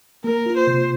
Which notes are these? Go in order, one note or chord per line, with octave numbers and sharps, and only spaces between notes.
A#3 A#4
F4
C5
C3